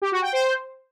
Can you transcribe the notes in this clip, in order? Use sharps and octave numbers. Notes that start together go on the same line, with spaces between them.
G4
F#4
G5
C5